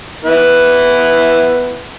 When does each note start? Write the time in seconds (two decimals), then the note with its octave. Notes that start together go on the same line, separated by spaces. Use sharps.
0.24 B3 E4 B4